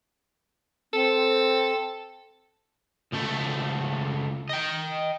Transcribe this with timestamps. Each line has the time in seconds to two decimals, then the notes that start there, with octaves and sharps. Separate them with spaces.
0.93 C4 A4
3.12 C#2 A3
4.49 D#5 G5